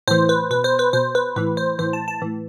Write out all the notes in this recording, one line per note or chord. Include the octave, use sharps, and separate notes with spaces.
A2 E3 C5
B4
B2 B4
C5
B4
B2 C5
B4
A2 E3 B4
C5
A2 E3 C5
A5
A5
A2 E3